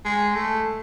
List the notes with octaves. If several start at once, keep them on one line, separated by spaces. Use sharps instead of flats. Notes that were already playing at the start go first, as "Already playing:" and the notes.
G#3
A3